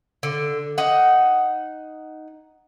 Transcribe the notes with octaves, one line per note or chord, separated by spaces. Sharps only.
D3
D#4 F#5